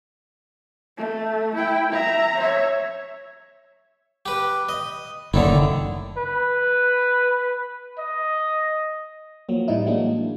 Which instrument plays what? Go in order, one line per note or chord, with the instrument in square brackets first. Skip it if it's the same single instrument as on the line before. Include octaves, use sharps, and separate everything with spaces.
[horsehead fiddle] A3
E4 G5
E5 A#5
C#5 E5
[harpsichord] G4 B4
D#5
[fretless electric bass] F#1 A2 [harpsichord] D3 D#3 E4
[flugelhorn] B4
D#5
[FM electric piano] F3 F#3 A#3
A2 E3 G3 D#4 E4
E3 F#3 G#3 A#3 D4